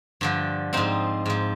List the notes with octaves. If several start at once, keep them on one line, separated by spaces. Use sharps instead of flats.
G2 D3 F3
G#2 F3 C4 D#4
G#2 F3